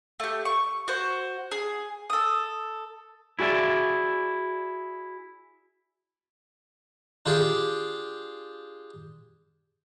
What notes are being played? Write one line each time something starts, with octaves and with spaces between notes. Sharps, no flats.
A3 G4
C#6
F#4 C5
G#4
A4 D#6
E4 F#4 G#4 D5 E5
D4 F4 G4 G#4